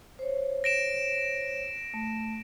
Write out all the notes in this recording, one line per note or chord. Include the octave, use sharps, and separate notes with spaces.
C5 C#5
A#6 D7 E7
A3